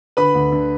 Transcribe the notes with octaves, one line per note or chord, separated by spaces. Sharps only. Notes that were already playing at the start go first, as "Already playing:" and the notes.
D3 B4 B5
D2
D3